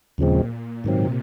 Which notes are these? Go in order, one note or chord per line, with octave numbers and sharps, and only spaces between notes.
D#2 A#2 C#3 F3 G#3 C4
G#2 C3 D#3 F#3 C4